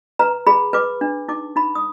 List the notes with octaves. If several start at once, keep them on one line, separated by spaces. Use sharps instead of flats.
B4 A#5
G#4 B5
B4 D6
D4
D#4 D6
D#4 B5
D#6